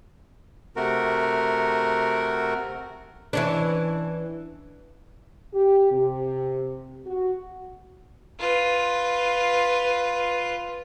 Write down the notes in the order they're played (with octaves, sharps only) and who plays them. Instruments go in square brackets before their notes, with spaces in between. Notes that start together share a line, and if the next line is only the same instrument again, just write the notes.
[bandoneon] C3 A3 F#4 A#4
[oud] E3 C#4 D4
[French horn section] G4
C3
F#4
[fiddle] F4 B4